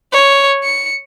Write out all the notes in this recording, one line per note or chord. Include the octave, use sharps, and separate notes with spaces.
C#5
C#7